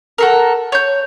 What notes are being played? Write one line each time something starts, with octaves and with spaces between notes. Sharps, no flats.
F#4 A4 A#4
C#5 G6